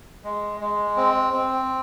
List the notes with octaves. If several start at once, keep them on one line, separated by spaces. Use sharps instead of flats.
G#3
G#3
C4
C4